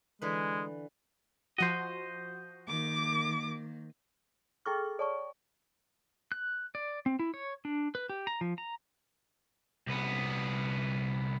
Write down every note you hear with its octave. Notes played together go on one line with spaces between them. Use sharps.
D3 E3 G#3 B4
F3 F#4 C5 D#5
D#3 A#3 D6
G#4 A4 G5 C#6 D6 F6
C#5 D5 A5 C#6
F#6
D5
C4
E4
C#5
D4
B4
G4
A#5
F3
A#5
C2 B3